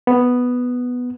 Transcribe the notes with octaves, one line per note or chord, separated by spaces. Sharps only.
B3